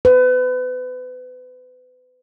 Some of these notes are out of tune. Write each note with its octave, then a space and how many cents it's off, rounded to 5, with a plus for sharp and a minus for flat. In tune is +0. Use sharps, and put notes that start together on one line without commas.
B4 +35